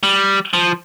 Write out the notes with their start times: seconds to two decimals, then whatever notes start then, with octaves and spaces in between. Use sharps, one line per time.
0.03 G3
0.53 F3